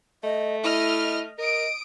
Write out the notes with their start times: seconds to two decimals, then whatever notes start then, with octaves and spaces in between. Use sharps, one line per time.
0.24 A3 D#5
0.63 E4 D#5 F6
1.38 A#4 D#5 D#6 D7